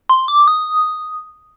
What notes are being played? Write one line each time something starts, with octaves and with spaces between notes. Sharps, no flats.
C6
D6
D#6